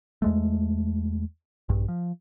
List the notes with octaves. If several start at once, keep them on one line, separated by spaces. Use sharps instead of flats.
E2 G#3 A3
A#1 G2
F3